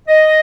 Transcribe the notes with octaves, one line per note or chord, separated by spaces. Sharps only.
D#5